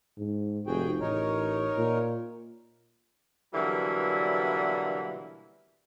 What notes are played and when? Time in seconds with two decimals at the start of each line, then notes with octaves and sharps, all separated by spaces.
0.18 G#2
0.67 F1 F#4 G#4 G5
1.00 A1 D#4 A#4 C#5
1.77 A#2
3.54 B2 D3 E3 F#3 G3 A#3